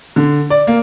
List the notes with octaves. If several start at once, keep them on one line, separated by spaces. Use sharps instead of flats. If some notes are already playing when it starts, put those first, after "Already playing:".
D3
D5
A#3